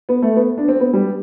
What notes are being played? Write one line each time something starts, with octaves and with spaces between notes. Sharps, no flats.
B3
A3
B3
D4
C4
B3
G3